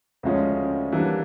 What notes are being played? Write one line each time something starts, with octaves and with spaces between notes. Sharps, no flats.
D2 C#3 F3 G#3 C#4
E3 G3 A#3 D4